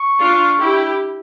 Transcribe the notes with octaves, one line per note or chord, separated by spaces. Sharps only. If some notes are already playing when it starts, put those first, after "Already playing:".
Already playing: C#6
D4 F4
E4 G4